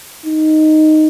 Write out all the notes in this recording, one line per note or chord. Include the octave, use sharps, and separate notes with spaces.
D#4